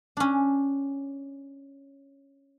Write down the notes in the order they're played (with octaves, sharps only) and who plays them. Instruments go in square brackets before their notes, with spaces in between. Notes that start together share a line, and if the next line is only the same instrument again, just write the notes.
[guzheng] C#4 D4